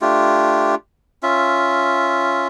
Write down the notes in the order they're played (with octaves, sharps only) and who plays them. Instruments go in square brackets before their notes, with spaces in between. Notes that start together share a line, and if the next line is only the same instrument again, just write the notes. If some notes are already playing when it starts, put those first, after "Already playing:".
[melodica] A3 D4 F4 G4
C#4 F4 E5